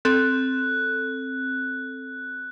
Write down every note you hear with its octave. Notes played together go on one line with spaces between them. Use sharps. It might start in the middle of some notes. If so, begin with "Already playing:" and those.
C4 A4 F#6